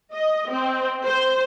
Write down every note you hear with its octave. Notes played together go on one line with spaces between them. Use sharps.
D#5
C4
C5